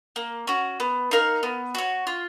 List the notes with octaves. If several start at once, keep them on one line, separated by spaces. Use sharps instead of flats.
A#3
C#4 F#4
B3
D#4 A#4 F5
B3
F#4 C#5
F4